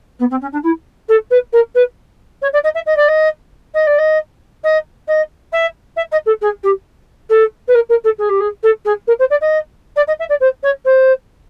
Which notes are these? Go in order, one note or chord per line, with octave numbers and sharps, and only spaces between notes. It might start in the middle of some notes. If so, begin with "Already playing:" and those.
B3
C4
C#4
D4
E4
A4
B4
A#4
B4
C#5
D5
D#5
E5
D#5
D5
D#5
D#5
D5
D#5
D#5
D#5
E5
E5
D#5
A4
G#4
G4
A4
B4
A#4
A#4
A4
G#4
G4
G#4
A4
G#4
A#4
C5
D5
D#5
D5
D#5
E5
D5
C5
C#5
C5